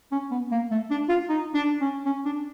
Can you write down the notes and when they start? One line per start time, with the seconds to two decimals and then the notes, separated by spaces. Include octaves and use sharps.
0.12 C#4
0.31 B3
0.51 A#3
0.71 A3
0.90 D4
1.09 F4
1.29 D#4
1.54 D4
1.81 C#4
2.06 C#4
2.25 D4